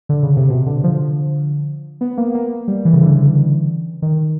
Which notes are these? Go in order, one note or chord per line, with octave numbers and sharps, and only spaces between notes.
D3
C#3
C3
B2
D3
F3
B3
A#3
A#3
G3
E3
C#3
D3
D#3